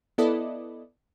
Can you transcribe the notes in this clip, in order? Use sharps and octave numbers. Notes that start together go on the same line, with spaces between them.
B3 E4 A4 B4 D5 D#5